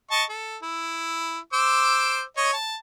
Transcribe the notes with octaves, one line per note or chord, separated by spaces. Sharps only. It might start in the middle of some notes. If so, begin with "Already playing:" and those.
D#5 A5 C#6
A4
E4
C5 D6 E6
C#5 D#5
A5